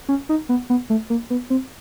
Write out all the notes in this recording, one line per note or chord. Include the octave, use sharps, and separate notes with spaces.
C#4
D#4
B3
B3
A3
A#3
B3
C4